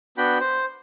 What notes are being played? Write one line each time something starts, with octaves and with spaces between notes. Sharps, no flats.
B3 D4 F#4 G5 B5
C5